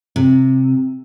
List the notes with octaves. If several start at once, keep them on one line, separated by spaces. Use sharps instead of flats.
C3